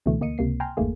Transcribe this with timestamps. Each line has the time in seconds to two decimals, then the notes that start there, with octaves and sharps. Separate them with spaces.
0.06 C#2 B2 D3 E3 A3
0.21 D2 A#3 D#5 C#7 D#7
0.38 C#2 C3 A#3 C7
0.60 G5 G#5 A#5 C6 F6
0.77 G1 E2 G#2 A3 A#3 G#4